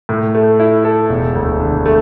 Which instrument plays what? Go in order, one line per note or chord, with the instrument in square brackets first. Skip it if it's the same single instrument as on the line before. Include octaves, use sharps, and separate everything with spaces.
[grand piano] A2
A3
E4
A4
E1
D2
D3
A3